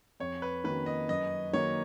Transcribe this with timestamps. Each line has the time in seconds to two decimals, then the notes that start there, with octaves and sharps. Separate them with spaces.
0.20 F2 C#5
0.42 B4
0.64 D#3 A#3 C#4 F#4 B4
0.86 D#5
1.08 F#2 D#5
1.53 D#3 F#3 A#3 C#5